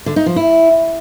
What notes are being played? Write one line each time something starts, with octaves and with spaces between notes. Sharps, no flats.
D3
D#4
F3
E4